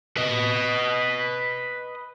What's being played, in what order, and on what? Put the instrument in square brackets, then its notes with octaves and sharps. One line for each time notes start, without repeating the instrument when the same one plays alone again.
[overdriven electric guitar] B4 D#5